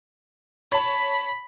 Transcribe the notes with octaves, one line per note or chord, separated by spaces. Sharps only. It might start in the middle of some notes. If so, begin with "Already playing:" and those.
C#5 A5 B5